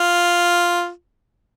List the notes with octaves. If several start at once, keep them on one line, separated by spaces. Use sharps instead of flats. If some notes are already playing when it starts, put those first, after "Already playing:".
Already playing: F4